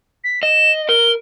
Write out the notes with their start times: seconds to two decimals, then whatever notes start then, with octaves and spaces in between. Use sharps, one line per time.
0.24 B6
0.43 D#5 E7
0.89 A#4 G7